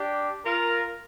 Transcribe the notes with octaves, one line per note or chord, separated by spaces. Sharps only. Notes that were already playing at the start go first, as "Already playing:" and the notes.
Already playing: D4 G4
F4 A#4